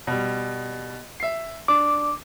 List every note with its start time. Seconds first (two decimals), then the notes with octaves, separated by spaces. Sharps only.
0.07 B2 G3
1.20 E5 C7
1.68 D4 D6